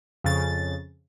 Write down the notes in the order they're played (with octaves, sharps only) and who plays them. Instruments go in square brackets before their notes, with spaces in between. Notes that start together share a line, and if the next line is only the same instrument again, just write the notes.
[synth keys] F2 C#3 A6